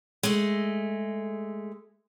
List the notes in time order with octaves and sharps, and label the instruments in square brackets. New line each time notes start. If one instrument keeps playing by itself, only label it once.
[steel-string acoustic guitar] G#3 A3